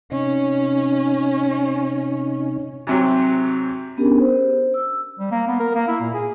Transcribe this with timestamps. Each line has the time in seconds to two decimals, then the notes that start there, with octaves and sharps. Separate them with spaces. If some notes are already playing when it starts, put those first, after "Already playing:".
0.11 C3 C#4 D#4
2.87 G#2 C3 F#3
3.98 B3 C#4 D4 G4 G#4 A#4
4.20 C5
4.74 E6
5.19 G3
5.32 A#3
5.48 B3
5.60 A#4
5.75 A#3
5.88 E4
6.01 A#2
6.14 G#4